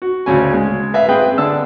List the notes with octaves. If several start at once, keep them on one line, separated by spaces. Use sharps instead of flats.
F#4
D2 C#3 C#4 G#5
G#3
B4 E5 F5
C4 G#4 B4 G5
D3 D4 A5 E6